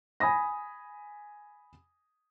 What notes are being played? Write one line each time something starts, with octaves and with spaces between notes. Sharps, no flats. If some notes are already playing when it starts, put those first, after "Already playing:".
G#5 B5 D#6 A#6